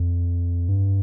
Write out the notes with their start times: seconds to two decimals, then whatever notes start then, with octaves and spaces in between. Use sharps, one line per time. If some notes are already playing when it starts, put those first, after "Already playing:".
Already playing: F2
0.69 G2